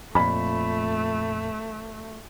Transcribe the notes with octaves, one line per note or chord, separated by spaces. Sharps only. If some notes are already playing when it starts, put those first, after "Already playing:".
F2 A#2 A3 B5